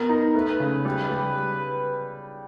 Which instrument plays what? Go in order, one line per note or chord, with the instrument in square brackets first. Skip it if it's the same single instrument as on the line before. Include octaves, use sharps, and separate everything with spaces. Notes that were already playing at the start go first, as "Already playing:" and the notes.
Already playing: [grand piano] B3 [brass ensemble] A#4
[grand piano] D#4
[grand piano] A3 [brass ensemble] B4
[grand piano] C#3
G3
G3